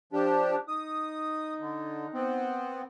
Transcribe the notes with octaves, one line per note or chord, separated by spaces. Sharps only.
F3 D4 G4
D#4 D#6
D3
B3 C4